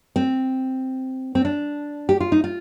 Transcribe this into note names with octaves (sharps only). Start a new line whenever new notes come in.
C4
C4
D4
G4
F4
D#4
F4